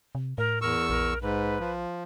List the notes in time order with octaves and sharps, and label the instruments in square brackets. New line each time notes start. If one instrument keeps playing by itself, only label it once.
[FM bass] C3
[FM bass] A2 [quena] A#4
[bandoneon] E2 C#6 E6 [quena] A#4
[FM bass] A#1 [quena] A#4
[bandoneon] G#2 [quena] B4
[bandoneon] F3